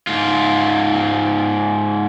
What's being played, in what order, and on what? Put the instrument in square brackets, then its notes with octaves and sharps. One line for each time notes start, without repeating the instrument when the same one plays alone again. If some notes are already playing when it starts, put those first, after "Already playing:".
[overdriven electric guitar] G#2 F4